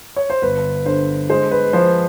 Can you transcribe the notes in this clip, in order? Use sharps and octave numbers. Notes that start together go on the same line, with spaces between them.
C#5
C5
G1 B4
D3 C5
G#3 C5
B4
F3 C5